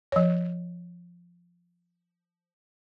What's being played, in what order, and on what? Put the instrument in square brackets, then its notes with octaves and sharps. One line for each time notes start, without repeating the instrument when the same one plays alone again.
[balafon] F3 C#5